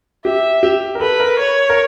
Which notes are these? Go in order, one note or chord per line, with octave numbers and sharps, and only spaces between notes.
G4 E5
G4
A#4
A4 B4
A#4
C#5
A#4